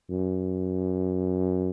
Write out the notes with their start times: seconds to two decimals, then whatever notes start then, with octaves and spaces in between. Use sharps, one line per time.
0.10 F#2